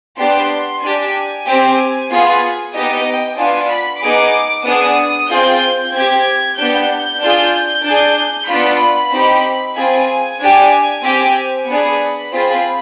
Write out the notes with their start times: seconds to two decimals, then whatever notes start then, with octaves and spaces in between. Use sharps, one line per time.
0.18 B3 D4 G4 C6
0.83 D4 G4 G#5
1.47 C4 G4
2.11 B3 F4 G#4
2.74 B3 D#4 G4 D#5
3.06 G5
3.37 B3 D4 F4 G#5
3.70 B5
4.02 B3 D#4 G#4 D6
4.65 B3 D4 G#4 D#6
5.30 C4 F4 G#4 G6
5.93 C4 G4 G#6
6.57 B3 D4 G4 G6
7.20 D4 F4 G#4
7.84 D4 G#4 G6
8.48 B3 D4 F4 B5
9.12 C4 D#4 G4
9.76 C4 F4 G#4 G#5
10.40 D4 G4
11.03 C4 G4
11.67 B3 D4 G#4 B5
12.32 C4 F4 G#4